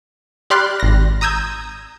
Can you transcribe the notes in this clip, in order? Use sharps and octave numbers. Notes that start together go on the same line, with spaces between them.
G4 D5 B5 C6 F6 F#6
G#1 A#6
A#5 D#6 E6 G6 G#6